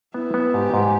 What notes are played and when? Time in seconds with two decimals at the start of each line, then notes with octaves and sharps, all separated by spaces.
0.14 B3 E4
0.34 B3
0.54 G#2 G4
0.74 G#2